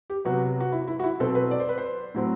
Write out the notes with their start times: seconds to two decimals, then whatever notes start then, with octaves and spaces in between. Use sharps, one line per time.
0.10 G4
0.25 C3 F#3 B3 F#4
0.60 F#4
0.72 E4
0.87 E4
0.99 F#4
1.04 E4
1.20 B2 F#3 C4 A4
1.35 B4
1.51 D5
1.60 C5
1.69 B4
1.78 C5
2.14 A2 F#3 C4